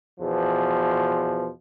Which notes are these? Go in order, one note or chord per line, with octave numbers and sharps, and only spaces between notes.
E2 B2 F3